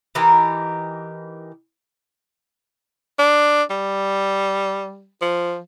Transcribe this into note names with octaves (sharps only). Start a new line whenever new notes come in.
E3 D#4 G4 A#4
D4
G3
F3